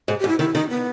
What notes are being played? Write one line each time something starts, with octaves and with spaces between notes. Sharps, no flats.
G#2 G#4
G4
G#2
E4
D#3 E4
D#3 D#4
B3